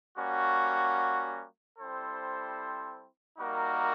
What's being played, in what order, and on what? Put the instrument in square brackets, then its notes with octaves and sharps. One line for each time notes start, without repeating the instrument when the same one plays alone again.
[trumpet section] G3 A#3 C#4 F#4
G3 C4 E4 A4 C5
G3 A#3 D#4 F#4 A#4